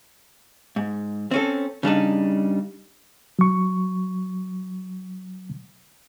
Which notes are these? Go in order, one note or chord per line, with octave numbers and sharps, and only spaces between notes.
G#2
C4 C#4 A4
C#3 G3 D4 D#4
F#3 C#6